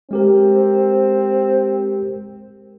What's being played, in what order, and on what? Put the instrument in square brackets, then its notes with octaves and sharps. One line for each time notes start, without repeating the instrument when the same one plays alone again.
[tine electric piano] G#3 G4 A#4 [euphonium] C4